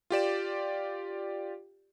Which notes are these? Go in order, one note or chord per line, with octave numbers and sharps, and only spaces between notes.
F4 G4 D5 E7